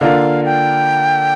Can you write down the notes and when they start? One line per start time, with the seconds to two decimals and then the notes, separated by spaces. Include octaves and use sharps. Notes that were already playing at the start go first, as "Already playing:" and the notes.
0.01 D3 A#3 D4 F4 A#4 F5
0.45 G5